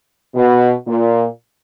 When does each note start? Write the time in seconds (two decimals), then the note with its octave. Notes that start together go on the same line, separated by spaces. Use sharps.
0.35 B2
0.88 A#2